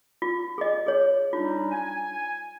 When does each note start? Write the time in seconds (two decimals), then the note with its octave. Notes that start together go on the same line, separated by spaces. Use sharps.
0.22 F4
0.58 G#4 D#5
0.86 G#4 C#5
1.33 G3 D4 D#4 F4
1.71 G#5